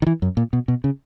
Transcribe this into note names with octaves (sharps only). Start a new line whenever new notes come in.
D#3
E3
F#2
A#2
B2
B2
C#3